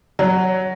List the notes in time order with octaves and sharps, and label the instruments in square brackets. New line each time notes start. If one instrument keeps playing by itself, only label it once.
[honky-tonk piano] F#3